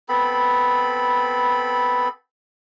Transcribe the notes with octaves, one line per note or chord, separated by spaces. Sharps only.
B3 C4 A4 B5